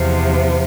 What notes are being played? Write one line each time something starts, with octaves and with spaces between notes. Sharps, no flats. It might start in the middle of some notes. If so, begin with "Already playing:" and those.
Already playing: E2 C3 F3